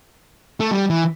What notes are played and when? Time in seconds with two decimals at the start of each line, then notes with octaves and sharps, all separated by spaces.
0.60 A3
0.71 G3
0.90 E3